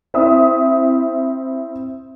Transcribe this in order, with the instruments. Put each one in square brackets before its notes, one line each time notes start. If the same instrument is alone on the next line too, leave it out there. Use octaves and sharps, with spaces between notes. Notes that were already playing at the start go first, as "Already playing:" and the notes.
[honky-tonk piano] C4 E4 E5 D#6